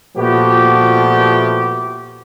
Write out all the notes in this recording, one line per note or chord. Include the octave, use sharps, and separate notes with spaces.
A#2 F3 A3 B3 F#4 G4